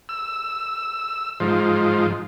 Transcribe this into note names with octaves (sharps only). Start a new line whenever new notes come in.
E6
G#2 F3